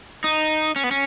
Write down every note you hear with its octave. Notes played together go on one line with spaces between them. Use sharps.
D#4
C#4
B3
C#4